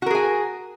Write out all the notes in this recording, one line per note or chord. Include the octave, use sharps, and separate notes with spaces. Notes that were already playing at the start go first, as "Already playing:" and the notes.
F#4 G#4 A#4 G#5